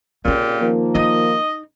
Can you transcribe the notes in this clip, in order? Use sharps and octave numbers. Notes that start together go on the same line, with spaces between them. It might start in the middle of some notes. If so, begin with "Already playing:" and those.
A#2 C#3 C4 C#4 G4
D#3 F3 A#3
D#4 D#5